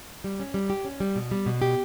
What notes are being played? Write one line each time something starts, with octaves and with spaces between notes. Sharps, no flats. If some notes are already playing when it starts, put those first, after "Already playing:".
G3
C#4
G3
G4
C#4
G3
B2
G3
B2
G4